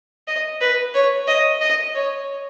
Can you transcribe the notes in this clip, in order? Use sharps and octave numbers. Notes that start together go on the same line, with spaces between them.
D#5
B4
C#5
D#5
D#5
C#5